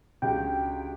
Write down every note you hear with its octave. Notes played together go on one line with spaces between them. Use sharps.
C#2 D4 F#4 G4 G5